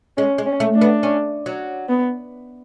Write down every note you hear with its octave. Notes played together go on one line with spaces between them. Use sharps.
G#3 C#4
G#3
C#4
A3
D4
B3
C#4
F#3
B3